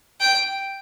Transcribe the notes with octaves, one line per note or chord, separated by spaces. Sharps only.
G5